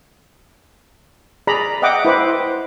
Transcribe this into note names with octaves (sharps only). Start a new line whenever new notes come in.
G#4 D5 A#5 B5
D#5 E5 F#5 G5 D6 D#6
E4 B4 C5 D6